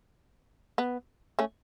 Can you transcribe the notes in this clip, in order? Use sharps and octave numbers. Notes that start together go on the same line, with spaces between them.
B3
A3 C#4